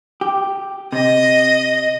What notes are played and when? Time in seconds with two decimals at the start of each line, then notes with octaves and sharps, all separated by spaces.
0.21 G4
0.92 C3 D#5